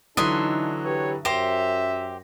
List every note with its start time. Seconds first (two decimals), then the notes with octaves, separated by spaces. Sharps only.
0.17 D3 E3 F#3 D#4 A4 D#5 E5 C6
0.85 G4 B4 C#5
1.25 F#2 G4 C5 E5 A#6